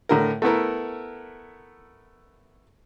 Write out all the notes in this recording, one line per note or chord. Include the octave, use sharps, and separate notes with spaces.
A2 D3 A#4
A3 B3 E4 A#4